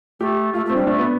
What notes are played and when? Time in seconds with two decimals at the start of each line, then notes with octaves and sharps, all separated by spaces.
0.20 A3 G4
0.54 A3 F4
0.65 A3 C4
0.76 G3 D4
0.87 A3 D4
0.99 B3